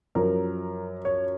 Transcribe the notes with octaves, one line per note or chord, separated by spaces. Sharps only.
F#2 F3 A#4
C#5